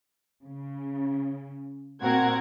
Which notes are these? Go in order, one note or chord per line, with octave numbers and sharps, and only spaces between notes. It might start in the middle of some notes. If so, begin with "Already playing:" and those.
C#3
A#2 C4 F#4 A#4 F#5 G#6